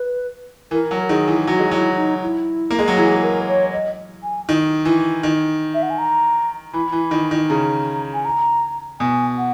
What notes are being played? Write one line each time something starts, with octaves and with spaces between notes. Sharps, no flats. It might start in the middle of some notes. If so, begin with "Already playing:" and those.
Already playing: B4
E3 A#4
F#3
D#3 G#4
E3
F#3 F#4
G#3
F#3 E4
D#4
E4
A#3
G#3
F#3
E3 G#4
A#4
C#5
D#5
G#5
D#3
E3
D#3
E5
F#5
G#5
A#5
E3 B5
E3
D#3
D#3
C#3 A#5
G#5
A#5
B2 G#5
F#5